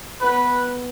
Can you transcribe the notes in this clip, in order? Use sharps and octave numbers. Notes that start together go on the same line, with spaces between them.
B3 B4